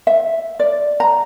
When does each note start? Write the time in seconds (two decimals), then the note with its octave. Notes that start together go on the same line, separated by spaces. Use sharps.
0.07 E5
0.60 D5
1.00 A#5